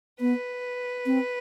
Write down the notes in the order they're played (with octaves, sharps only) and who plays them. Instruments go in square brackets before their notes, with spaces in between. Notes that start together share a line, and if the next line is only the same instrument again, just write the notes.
[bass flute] B3 [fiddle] B4
[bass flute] C4